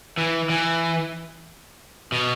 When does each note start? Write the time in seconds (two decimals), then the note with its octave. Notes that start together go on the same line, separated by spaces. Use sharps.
0.17 E3
0.50 E3
2.12 B2